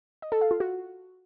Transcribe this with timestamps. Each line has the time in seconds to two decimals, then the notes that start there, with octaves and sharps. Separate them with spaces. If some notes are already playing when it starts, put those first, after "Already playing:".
0.22 D#5
0.32 A4
0.41 F5
0.51 F4
0.60 F#4